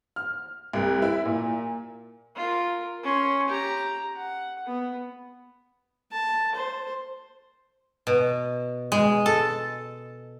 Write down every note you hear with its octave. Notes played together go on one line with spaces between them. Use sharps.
F6
C2
E4
A#2
F4 A#4
C#4 C6
G4 A#5
F#5
B3
A5
C5
B2
G#3
A4